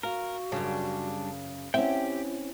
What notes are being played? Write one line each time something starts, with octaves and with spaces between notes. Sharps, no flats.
F#4 A#4 F5
F#2 C#3 G3 D4
C4 C#4 E4 G4 E5 G5